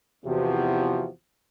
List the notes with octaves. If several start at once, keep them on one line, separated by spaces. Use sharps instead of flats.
E2 C3 F3 F#4